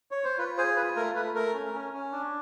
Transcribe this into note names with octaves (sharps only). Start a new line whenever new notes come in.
C#5
C5
F4 B4
G#4 C5
F4 B4
A3 A#4
A3 B4
A3 A#4
C#4
C#4
C#4
D4